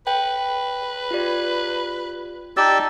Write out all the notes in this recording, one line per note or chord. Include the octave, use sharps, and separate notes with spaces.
B4 G5
F4 G4 D5
D#4 G4 D5 A5 A#5 E6 A6